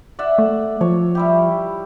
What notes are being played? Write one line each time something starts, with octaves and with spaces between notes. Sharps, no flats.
D5 E5 F#5
A3
F3 C#5
G3 E4 G4